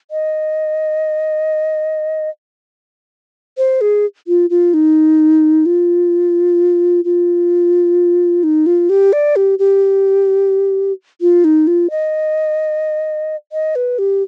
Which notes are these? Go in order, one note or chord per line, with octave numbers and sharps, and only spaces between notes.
D#5
C5
G#4
F4
F4
D#4
F4
F4
D#4
F4
G4
D5
G4
G4
F4
D#4
F4
D#5
D#5
B4
G4